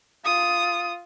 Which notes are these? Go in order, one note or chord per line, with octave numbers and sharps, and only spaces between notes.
F4 D#6